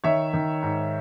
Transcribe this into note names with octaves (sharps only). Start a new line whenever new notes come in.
D#3 C#5 E5
D#3
G#2